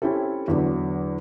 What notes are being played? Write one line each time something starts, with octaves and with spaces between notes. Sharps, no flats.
C4 C#4 E4 G4 A4
E2 D3 F#3